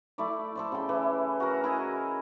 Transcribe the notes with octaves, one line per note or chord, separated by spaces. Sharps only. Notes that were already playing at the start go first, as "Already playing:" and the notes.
A3 E4 D5
A4 C5 D5
C#3 G5
E3
F#4 A#4
E4 G#4 D#5